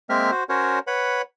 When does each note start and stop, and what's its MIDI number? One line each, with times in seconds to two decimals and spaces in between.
0.10 0.31 56
0.10 0.31 58
0.10 0.31 60
0.10 0.31 70
0.10 0.31 76
0.10 0.31 89
0.31 0.44 66
0.31 0.44 72
0.49 0.79 61
0.49 0.79 66
0.49 0.79 70
0.49 0.79 72
0.49 0.79 73
0.87 1.22 71
0.87 1.22 73
0.87 1.22 78
0.87 1.22 83